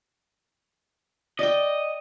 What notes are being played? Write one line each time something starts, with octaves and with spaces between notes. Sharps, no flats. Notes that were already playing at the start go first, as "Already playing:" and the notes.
D5 D#5 G5